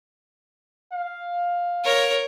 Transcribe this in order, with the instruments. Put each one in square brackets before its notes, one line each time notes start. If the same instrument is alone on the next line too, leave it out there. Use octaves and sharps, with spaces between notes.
[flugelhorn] F5
[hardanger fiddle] A#4 C#5